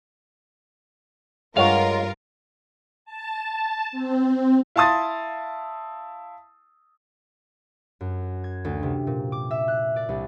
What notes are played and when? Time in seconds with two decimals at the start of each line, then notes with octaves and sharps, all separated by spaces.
1.57 G2 G#3 F4 A#4 C#5 F5 F#5
3.05 A5
3.92 C4
4.76 E4 F5 A5 C6 D#6 A6
8.01 F#2
8.44 G#6
8.65 D2
8.83 C3
9.07 A#2
9.32 D6
9.51 E5
9.68 F#6
9.96 D5
10.09 C2